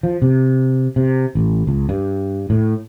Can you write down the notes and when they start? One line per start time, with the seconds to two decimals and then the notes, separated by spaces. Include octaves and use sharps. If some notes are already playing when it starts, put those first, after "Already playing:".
0.03 F3
0.22 C3
0.96 C3
1.35 A1
1.67 C#2
1.89 G2
2.50 A2